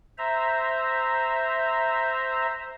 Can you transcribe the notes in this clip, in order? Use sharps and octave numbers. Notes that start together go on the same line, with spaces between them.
C5 E5 A#5